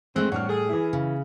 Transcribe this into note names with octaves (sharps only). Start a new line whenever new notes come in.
A2 D3 G#3 A3 C4 F#6
A2 G3 C4 D4 C#5 F#5 F6
G#4 A4
E3 E4
C#3